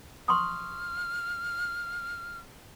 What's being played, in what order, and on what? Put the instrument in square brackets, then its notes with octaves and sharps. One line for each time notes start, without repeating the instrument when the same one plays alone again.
[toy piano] C6 C#6 D#6 [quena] F6